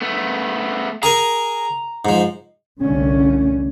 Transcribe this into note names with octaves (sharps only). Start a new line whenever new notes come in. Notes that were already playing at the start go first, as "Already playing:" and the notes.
A3 B3
G#4 A#4 G#5 A#5
G#2 F3
F1 C2 D3 A3 C#4